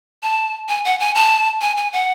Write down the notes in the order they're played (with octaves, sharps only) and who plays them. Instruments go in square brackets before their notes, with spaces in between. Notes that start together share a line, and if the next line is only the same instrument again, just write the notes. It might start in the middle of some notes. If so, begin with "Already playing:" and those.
[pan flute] A5
G#5
F#5
G#5
A5
G#5
G#5
F#5